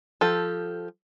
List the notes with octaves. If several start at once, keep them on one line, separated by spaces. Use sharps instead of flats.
F3 G4 A4